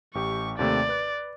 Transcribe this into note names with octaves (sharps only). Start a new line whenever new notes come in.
A1 G4 C#6
D#2 C3 A3 D5
B4 F#6